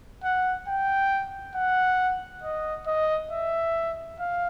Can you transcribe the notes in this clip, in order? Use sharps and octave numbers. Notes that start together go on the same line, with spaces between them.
F#5
G5
F#5
D#5
D#5
E5
F5